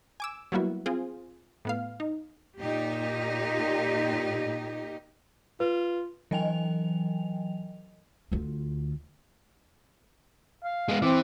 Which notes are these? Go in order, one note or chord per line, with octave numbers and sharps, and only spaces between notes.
G#5 D6 E6
F#3 G3 A#3 B3 E4 F#4
C4 F4 G#4
A2 B3 F5
D#4
A#2 D#4 G4
F4 B4
E3 F#3 D#5 G5 G#5 F7
D2 F4
F5
G#3 B3
E3 C4 D6